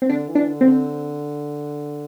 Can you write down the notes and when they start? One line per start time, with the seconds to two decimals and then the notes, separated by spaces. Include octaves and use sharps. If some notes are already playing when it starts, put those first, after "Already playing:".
0.02 C4
0.09 D3 D4
0.28 E3
0.35 D4
0.48 D3
0.61 C4
0.68 D3